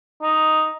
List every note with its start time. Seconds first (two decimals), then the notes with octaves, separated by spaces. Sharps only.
0.22 D#4